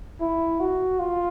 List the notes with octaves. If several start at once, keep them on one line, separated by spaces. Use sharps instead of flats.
E4
F#4
F4